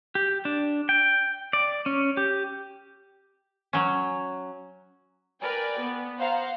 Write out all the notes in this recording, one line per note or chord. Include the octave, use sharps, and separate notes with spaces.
G4
D4
G5
D5
C#4
G4
F#3 C#4
A#4 B4 D5 G5 G#5
B3
C5 F5 F#5 A#5